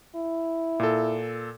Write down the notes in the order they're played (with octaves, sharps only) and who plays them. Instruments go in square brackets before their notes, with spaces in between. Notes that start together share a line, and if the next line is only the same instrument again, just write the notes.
[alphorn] E4
[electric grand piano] A#2 A4